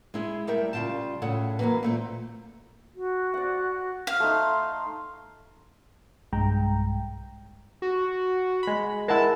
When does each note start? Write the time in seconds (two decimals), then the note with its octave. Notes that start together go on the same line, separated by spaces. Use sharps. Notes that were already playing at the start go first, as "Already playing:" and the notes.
0.14 G#3 E4 G#4
0.47 G3 A3 A#4 E5 G5
0.73 C#3 G3 F4 G5 A5
1.22 A2 C#3 A4 C#5 F#5
1.59 E3 F#3 A3 A#3 B4
1.83 A#2 A3 C4
2.95 F#4
3.34 D5 F#5
4.07 F5
4.20 A3 D#4 C6
6.32 B1 G2 G#3 G5 A#5
7.82 F#4
8.63 G#3 B5
9.08 G#3 E4 A#4 F#5 A5